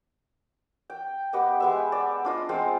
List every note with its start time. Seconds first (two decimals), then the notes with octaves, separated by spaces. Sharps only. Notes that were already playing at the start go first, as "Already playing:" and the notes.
0.90 G5
1.33 B3 G4 D#5 F#5
1.60 G#3 B3 E5
1.92 D5
2.25 D4 F4 D#5
2.49 G#3 C4 F4 C5